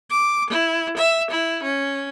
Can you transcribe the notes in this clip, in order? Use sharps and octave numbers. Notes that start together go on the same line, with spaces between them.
D6
E4
E5
E4
C#4